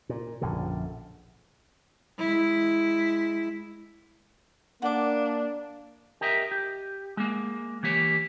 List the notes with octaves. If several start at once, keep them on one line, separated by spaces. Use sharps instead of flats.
A#2
A#1 F#2 D3
G#3 E4
A#3 D4 F#5 D6
G4 A#4 D#5 E5
G4
G#3 A#3
E3 A#3 G4 C#5